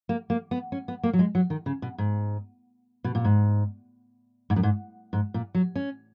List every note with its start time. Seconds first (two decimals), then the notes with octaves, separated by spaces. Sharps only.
0.09 A#3
0.30 A#3
0.51 B3
0.72 C#4
0.88 B3
1.03 A#3
1.13 F#3
1.19 G#3
1.35 F#3
1.50 D#3
1.66 C#3
1.82 B2
1.98 G#2
3.04 B2
3.15 A#2
3.24 G#2
4.50 G#2
4.56 F#2
4.63 G#2
5.13 G#2
5.34 A#2
5.55 F#3
5.76 C#4